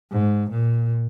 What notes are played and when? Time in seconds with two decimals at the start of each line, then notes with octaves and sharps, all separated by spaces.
0.12 G#2
0.50 A#2